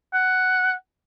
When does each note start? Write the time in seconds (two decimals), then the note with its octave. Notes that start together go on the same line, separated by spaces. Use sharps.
0.14 F#5